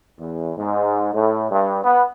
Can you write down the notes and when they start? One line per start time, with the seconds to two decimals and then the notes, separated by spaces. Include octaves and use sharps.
0.19 E2
0.57 G#2
1.12 A2
1.50 G2
1.83 B3